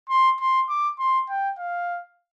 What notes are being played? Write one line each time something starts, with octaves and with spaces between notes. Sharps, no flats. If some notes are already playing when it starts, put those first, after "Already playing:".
C6
C6
D6
C6
G5
F5